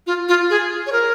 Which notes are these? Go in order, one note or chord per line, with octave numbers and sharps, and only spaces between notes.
F4
F4
G#4
C#5
A#4